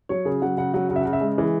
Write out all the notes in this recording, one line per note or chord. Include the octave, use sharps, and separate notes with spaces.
F#3 C#5
C#3 G#4
F#3 F#5
C#3 F#5
F#3 F#5
C#3 F#5
E5
C#3 F#5
E5
G#3
E3 G#4